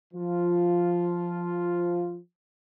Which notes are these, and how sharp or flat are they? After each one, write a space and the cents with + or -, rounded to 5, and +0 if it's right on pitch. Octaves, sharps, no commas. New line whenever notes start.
F3 +0 F4 +0